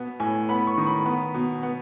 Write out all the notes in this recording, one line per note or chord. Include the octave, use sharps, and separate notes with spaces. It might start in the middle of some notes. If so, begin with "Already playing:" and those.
Already playing: B2 B3
A2 G#5
B3 B5
C#6
D#3
B5
B3
B2
B3